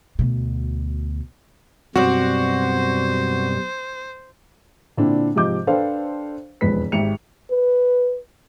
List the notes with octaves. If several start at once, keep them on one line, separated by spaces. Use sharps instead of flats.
D2 B2
F#2 B2 G3 C4 F#4 C5 D5
A#2 D3 C4 D4 E4
G#2 C3 F3 D#5 D6 G6
D4 A4 B4 C5 F5 G5
E1 F2 G#2 B4 B6
G#1 G#2 G4 E5 C#7 F7
B4